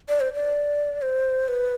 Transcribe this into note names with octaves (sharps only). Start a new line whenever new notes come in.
D5
C5
D5
C5
B4